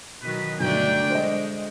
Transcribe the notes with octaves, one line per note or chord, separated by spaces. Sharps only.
B2 D#3 F#3 B4
B1 G2 D3 A3 D4 G5
G#3 C5 D#5